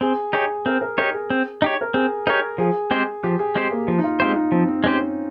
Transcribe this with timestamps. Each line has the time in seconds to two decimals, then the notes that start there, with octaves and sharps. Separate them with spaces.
0.01 C4 G#4
0.33 D#4 G4 G#4 C#5
0.66 C4 A#4
0.81 A#4
0.98 D#4 G4 A#4 C#5
1.14 G#4
1.30 C4
1.62 D#4 G4 C#5
1.81 A#4
1.94 C4 G#4
2.27 D#4 G4 A#4 C#5
2.58 F3 G#4
2.91 G#3 C4 G4 C5
3.23 F3 G4
3.39 G#4
3.55 G#3 C4 G4 G#4 C5
3.71 A#3
3.88 F3 A#3
3.98 D#4
4.04 F4
4.20 G#3 C4 F4 G4 C5
4.36 D#4
4.52 F3 C4
4.68 C4
4.84 G#3 C4 C#4 G4 C5
5.01 C#4